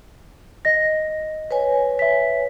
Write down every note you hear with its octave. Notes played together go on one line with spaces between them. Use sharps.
D#5 A#6
B4 C#5 G#5
E5 B6